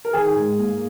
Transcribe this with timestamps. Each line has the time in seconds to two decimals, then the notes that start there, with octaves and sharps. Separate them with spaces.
0.05 A#4
0.13 D#3 G#4
0.36 G#2
0.58 A#3